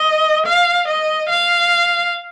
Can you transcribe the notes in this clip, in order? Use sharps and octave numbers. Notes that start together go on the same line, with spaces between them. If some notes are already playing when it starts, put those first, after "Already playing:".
Already playing: D#5
F5
D#5
F5